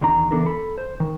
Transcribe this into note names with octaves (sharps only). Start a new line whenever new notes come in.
E2 D#3 D4 A#5
C#2 E3 B3 D4 A4 A#4
A4 B5
C5
D#3